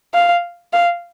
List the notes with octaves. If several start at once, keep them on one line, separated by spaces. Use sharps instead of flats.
F5
F5